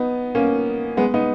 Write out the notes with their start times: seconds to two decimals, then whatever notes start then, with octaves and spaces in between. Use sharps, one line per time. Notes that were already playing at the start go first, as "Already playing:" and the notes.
Already playing: B3 D#4
0.35 A#3 C#4
0.97 G#3 B3
1.14 B3 D#4